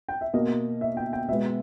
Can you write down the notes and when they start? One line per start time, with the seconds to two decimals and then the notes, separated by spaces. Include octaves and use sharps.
0.09 G5
0.21 E5
0.33 B2 A#3 D#5
0.81 E5
0.97 G5
1.13 G5
1.28 B2 E5
1.31 G#3 B3